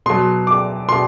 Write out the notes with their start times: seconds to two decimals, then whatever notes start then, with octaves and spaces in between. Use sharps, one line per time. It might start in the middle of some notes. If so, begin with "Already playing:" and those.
0.06 B2 F#3 C6
0.47 D6
0.88 B2 C6